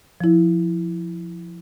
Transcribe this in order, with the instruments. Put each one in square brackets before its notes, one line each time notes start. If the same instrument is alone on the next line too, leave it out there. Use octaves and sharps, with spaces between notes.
[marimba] F3 E4